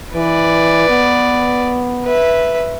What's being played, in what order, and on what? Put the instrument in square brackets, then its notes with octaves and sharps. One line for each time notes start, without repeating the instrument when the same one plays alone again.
[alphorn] E3 [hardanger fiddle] B4 D5
[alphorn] B3
[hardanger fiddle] B4 E5